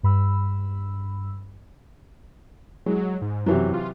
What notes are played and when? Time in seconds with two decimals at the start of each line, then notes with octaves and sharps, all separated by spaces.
0.03 G2 B5 E6
2.86 F#3 G#3
3.22 G#2
3.46 F#2 C3 E3 F#3
3.74 F4